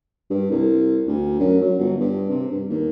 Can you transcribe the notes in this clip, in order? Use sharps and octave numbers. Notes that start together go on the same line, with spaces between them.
G2
C2
D2
F#2
F#3
G1
G2
C3
G2
D#2